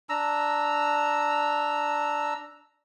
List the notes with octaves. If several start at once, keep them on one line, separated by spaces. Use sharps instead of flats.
D4 A#5 E6